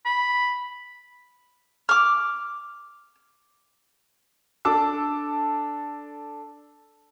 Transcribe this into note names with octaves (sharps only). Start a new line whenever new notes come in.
B5
D6 F6
D4 A4 A5 D6 E6